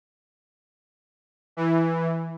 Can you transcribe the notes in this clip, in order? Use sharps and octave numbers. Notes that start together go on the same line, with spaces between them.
E3